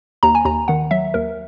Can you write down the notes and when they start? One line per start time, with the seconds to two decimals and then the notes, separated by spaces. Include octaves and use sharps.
0.23 D#2 A#5
0.35 G#5
0.45 D#2 A#5
0.68 D#3 F#5
0.91 F#3 E5
1.14 D#2 A#4